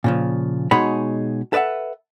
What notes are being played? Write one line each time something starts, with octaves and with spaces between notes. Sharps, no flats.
A#2 C#3 F3
B2 G#3 D#4 G#4 C#5 B5
A4 B4 D5 E5 F#5